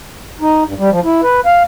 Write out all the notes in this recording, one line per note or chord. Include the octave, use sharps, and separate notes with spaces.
D#4
G2
G3
F3
E4
B4
F5